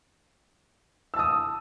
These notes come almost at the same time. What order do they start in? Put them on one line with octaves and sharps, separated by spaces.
E6 A5 D#6